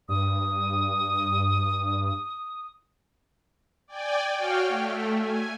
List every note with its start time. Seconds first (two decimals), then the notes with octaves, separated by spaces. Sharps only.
0.08 G2 D#6
3.88 D5 G5 G#5
4.36 F#4 C#5 F5 G5 F6
4.68 A3
5.18 G#5